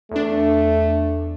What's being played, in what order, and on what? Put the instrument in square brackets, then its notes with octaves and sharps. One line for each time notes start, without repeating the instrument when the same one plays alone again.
[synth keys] E2 D4 [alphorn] A3